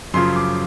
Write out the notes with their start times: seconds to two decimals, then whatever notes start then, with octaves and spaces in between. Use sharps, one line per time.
0.14 F#2 C#3 F3 C6
0.36 D6